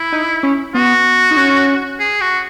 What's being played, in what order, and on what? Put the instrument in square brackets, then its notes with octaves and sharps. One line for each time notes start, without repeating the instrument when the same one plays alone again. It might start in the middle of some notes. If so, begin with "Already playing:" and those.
Already playing: [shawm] E4
[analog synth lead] D#4
C#4
[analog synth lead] B3 [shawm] F#4
[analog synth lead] D#4
C#4
[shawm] G#4
F#4